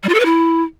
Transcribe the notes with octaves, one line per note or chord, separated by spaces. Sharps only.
G3
F4
A4
B4
E4